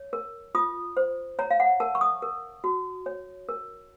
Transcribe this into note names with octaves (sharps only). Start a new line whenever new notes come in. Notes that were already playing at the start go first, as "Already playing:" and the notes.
Already playing: C#5
A#4
F4 D#6
C5
C#5 A#5
F5
F#5
A#4 A5
C#6
D#6
A#4
F#4
C#5
A#4